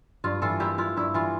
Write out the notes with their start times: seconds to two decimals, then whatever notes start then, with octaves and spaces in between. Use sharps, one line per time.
0.24 G2 F4
0.42 E3 F4 A4
0.60 A#3 E4 G4
0.78 E4 F4
0.97 G2 E4
1.14 E3 F4